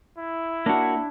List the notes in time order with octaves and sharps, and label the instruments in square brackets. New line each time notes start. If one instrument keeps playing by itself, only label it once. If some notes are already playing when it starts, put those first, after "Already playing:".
[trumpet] E4
[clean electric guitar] A#3 F#4 [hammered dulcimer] D4